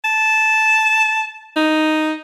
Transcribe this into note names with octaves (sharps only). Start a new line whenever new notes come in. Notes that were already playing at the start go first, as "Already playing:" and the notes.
A5
D#4